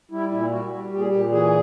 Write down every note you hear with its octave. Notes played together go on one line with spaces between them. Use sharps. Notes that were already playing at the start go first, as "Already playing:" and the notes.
G3 E4
A#2 E4
G3 F#4
G3
A#2 G4
G#4
A#2 G4
E3 G#4